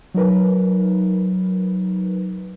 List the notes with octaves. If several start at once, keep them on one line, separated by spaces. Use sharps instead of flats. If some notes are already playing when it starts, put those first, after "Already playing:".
F#3 D#4 A#4 B4